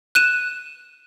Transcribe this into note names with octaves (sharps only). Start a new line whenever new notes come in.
F#6 D#7 E7